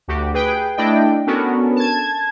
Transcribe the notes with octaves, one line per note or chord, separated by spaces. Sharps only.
D2 F#4 G4
G#4 B4 G5
A3 D4 E4 D5 D#5 G5
B3 C#4 D4 F#4 A4 A#4
A5 G#6